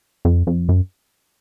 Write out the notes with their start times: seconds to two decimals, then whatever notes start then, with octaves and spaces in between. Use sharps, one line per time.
0.25 F2
0.47 F2
0.69 F#2